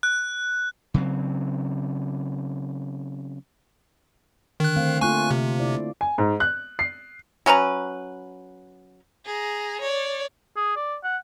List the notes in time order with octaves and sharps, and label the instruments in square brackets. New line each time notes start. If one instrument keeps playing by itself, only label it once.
[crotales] F#6
[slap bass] C#3 F#3 C4
[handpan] D3 [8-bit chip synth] D#3 F#6
[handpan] A3 C4 F5
[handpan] A3 A#3 F4 [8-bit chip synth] G#5 C#6 F#6
[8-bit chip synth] C3
[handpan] E4 D5
[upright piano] G#5
G#2
F#6
C7
[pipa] F#3 C#4 B4 A#5
[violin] G#4 A#5
C#5 D5
[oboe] G#4
D5
F#5